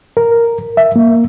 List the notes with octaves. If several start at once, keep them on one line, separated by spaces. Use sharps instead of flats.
A#4
E5
A#3